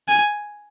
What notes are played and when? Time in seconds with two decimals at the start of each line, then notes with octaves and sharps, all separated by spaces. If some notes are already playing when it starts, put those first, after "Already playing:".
0.08 G#5